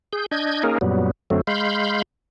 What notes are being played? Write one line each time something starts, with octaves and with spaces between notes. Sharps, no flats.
G#4 G6
D4 D#5 G6 G#6
A#3 C#4 D#4 G#4 A#4
F#2 A#2 F#3 G3 B3
F#2 D3 F#3 A3 C4
G#3 F5 B5 C6 G6